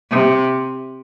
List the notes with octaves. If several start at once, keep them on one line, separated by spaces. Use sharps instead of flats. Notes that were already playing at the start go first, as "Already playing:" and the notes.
C3